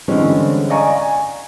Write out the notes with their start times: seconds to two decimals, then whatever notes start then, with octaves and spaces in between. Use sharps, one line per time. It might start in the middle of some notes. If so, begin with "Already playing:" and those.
0.08 D3 E3 G3 G#3 C4 C#4
0.70 D5 D#5 F5 G#5 A#5 C#6
0.98 G#5